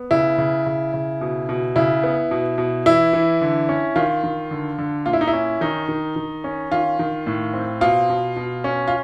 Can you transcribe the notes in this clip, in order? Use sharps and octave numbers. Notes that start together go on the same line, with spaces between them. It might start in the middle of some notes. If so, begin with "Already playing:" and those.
Already playing: B3
C#3 E4
C#3
C#3
C#3
B2
B2
C#3 E4
B3
B2
B2
E3 E4
E3
D3
C#4
D#3 F4
D#3
D3
D3
A#2 F4
E4
D#4
E4
C#4
D#3 D#4
D#3
D#3
C#4
D#3 F4
D#3
A2
C4
B2 F4
B2
B2
C#4
F4